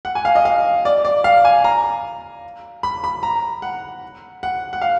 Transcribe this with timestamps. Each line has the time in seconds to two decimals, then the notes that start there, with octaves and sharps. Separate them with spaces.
0.05 F#5
0.15 G#5
0.25 F5
0.35 D#5
0.45 F5
0.85 D5
1.05 D5
1.24 F5
1.45 G#5
1.64 A#5
2.83 B5
3.04 B5
3.23 A#5
3.62 F#5
4.43 F#5
4.73 F#5
4.82 F5